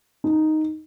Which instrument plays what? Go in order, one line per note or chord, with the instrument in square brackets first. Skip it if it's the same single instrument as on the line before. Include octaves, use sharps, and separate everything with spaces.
[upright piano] D#4